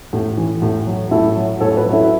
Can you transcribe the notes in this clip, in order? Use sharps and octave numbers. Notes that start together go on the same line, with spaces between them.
A2
E3
A2
F#3
A2 E4 A4
F#3
A2 A4 C#5
A4
F#4 B4
F#3
E4 A4